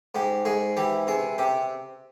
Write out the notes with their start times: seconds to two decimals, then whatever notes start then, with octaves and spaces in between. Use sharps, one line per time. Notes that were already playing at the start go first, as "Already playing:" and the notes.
0.15 G#2 G4
0.45 G#2 G#4
0.77 E3 G4
1.07 C3 G#4
1.38 C3 G4